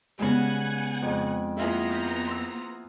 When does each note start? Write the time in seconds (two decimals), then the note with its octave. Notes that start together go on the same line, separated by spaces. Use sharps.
0.19 C#3 G3 G#3 B3 F#5 G#5
1.02 F2 G#2
1.57 A#3 B3 E4 F4 G#4 A#5
1.90 G6
2.27 C6 E6